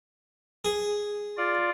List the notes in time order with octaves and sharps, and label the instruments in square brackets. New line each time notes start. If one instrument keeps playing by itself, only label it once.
[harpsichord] G#4
[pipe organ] F4 D5